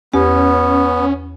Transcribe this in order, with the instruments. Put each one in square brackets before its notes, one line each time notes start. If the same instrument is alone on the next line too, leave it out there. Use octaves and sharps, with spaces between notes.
[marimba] E2 G4 [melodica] B3 [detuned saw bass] C#4